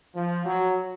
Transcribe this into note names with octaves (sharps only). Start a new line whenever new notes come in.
F3
F#3